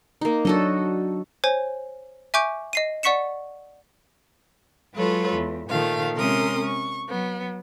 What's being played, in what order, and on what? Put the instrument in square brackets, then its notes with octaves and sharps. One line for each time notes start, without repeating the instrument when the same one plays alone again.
[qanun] A#3 D#4
[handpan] F#3 D4 [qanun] F#4 A4 D#5
[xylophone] C5 C#5 G#5
E5 G#5 C#6 D6 G6 D7
D#5 C7 D#7
D5 F#5 C#6 B6 C#7 E7
[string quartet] F#3 G#3 F4 A4 B4 C#5
E2
A#2 D#3 F3 A3 F5
C3 G#3 C#4 A#4 C6 D#6
C#6
F#3 B3